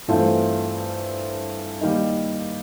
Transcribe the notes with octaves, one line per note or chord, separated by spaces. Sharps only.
G2 E3 A3 C4 F4
D#3 G3 A#3 D#4